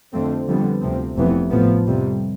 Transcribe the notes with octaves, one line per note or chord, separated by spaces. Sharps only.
F2 D3 F3 A3 C4
F2 D3 G3 B3
D2 C3 F3 C4
F1 F2 C3 E3 B3
A1 A2 F3 B3
F2 C3 G3